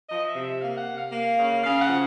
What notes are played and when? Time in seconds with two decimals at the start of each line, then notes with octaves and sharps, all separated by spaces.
0.09 F3 D#5
0.26 E5
0.34 C3
0.43 E5
0.60 A#3 F5
0.77 F#5
0.86 C3
0.95 F5
1.12 A#3
1.38 C#3
1.63 C#3 F5
1.81 F#5
1.89 F3